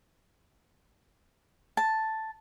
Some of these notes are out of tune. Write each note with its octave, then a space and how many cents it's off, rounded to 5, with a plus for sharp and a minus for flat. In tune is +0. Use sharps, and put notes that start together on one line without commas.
A5 +0